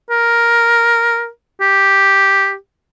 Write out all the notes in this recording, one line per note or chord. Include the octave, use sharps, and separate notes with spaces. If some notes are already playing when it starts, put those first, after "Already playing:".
A#4
G4